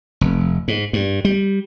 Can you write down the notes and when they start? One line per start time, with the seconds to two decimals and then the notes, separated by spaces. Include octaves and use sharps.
0.21 F1
0.68 G#2
0.93 G2
1.25 G3